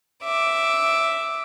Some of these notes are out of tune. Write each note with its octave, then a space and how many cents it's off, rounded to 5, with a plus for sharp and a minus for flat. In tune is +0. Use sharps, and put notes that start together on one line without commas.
E5 +0 D6 +0